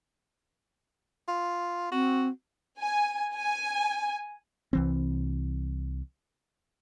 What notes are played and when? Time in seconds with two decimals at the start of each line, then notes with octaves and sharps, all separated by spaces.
1.28 F4
1.92 C4 F#4
2.79 G#5
3.35 G#5
4.73 C2 E3 C4